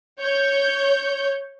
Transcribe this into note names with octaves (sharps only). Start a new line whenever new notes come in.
C#5 G6